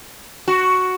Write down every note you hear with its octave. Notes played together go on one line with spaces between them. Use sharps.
F#4